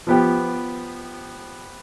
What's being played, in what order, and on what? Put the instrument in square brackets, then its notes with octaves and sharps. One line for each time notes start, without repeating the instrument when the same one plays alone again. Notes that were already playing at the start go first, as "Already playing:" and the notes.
[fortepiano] F3 B3 G4